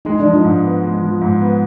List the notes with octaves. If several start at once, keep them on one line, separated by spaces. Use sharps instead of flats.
G#3 D#4
D4
F3
D#4
G#2
B3
G#3
F3
G#2
B3